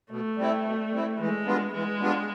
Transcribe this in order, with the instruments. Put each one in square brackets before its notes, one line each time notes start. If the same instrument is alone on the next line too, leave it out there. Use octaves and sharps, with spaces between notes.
[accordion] B2 [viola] A3
[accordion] G3 C4 E4
B2
G3 C4 E4
[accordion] E3 [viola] G#3
[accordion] G3 B3 D4 F4
[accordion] E3 [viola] G#3
[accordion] G3 B3 D4 F4